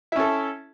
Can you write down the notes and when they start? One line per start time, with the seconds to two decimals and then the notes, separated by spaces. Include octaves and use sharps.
0.12 E4
0.16 C#4
0.19 A4